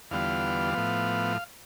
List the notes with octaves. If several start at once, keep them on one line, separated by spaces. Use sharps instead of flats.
E2 D3 G3 B3 F4 F5
A2 F3 B3